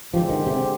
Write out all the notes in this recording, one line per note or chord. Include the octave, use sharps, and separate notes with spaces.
D3 F3 G#3 C4 G4
D#3
C3